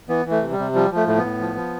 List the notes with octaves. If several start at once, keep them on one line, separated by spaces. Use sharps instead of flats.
E3 B3
E3
A3
C3
G3
C3
F3 G3
F3
A3
A2 A3
B3
A2
F3
F3